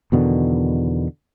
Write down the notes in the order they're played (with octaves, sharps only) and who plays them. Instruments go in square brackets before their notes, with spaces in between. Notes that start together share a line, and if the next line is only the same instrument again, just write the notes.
[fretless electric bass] E2 B2 D3 D#3